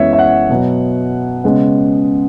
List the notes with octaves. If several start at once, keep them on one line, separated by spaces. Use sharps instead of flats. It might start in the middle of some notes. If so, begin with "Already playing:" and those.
Already playing: F#2 E3 G#3 B3 C#5 E5
E5
F#5
B2 F#3 B3
C#3 G#3 B3